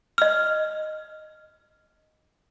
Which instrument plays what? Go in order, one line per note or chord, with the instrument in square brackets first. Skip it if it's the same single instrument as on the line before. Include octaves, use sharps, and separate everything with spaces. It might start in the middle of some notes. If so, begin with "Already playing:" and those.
[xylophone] D#5 F6